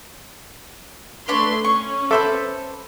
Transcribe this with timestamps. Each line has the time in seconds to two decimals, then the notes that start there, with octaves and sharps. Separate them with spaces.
1.28 A3 D4 B4 C#5 C6
1.64 C#4 C#6
2.11 A4 B4 C5 E5 D6